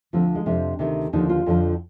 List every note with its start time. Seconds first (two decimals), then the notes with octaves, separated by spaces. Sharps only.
0.13 D2 D3 F3 C4
0.35 G#3
0.46 F2 C3 F3 D4
0.79 D2 C3 D#3
1.13 D#2 D3 F3 D#4
1.29 F4
1.46 F2 D3 F3